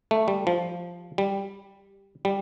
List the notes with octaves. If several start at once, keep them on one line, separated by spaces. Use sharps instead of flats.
A3
G3
F3
G3
G3